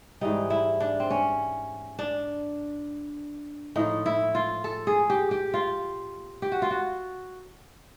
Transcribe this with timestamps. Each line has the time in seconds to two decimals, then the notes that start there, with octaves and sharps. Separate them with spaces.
0.21 G#2 E3 G3 D#4
0.50 E4
0.80 D4
1.00 C4
1.10 C#4
1.99 D4
3.76 A2 F3 D#4
4.06 E4
4.35 F4
4.64 A4
4.87 G#4
5.10 G4
5.31 G4
5.54 F4
6.42 G4
6.52 F#4
6.62 F4
6.71 F#4